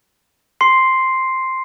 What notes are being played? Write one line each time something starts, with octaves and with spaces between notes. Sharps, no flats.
C6 C7